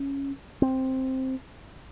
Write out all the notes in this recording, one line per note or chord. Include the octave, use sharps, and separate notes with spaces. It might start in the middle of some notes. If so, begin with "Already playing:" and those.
Already playing: C#4
C4